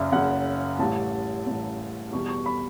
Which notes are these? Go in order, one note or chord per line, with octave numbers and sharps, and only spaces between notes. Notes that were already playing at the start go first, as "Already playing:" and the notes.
Already playing: F#1 F#2 C#3 D5 E5
F#1 F#2 C#3 F#5
A1 A2 G3 A5
A1 A2 G3
E2 B2 G3 C#6
C#6
B5